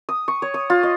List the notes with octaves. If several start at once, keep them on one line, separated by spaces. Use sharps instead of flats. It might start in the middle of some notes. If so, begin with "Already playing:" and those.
D#6
C#6
C#5
D#6
F4
D#5